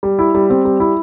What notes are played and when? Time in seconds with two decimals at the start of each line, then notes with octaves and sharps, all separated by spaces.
0.03 G3
0.19 E4
0.35 G3
0.50 C4
0.65 G3
0.80 E4